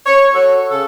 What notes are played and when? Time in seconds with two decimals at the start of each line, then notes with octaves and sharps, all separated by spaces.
0.05 C#5
0.35 F#4 A4 C#5
0.70 C#3 A4